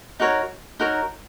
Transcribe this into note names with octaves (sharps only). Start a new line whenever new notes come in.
D#4 F#4 A#4 C#5
D#4 F#4 A#4 C#5